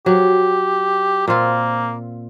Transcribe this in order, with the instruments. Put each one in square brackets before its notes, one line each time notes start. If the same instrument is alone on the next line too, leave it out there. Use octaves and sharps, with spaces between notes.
[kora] F#3 [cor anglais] G4
[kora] A#2 C4 F4 [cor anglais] A#3